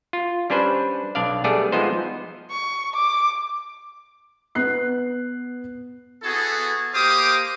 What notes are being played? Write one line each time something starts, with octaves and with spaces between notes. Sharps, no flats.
F4
G3 C#4 D4 B4 C5
B1 D4 D5 F5
G3 A3 B3 G#4 A4 D5
F3 G#3 B3 D#4 C5
C#6
D6
B3 F#6 C7
B3 E4 F#4 G#4 A4
A#3 G4 C5 F5 D6 D#6